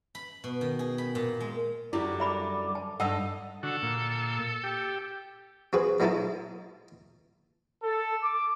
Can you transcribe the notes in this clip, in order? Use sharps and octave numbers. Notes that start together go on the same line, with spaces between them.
B5
B2
D#3
G#4
B5
A#2
G#3
F#2 D3 G3 E4 D5
E5 B5 D6
A5
G2 D#4 A4 D#5 F#5 A5 E6
D3 F#4 A4
A#2
G4
C4 F#4 G#4 B4
F#3 G#3 B3 D#4 E4 A4
A4
D6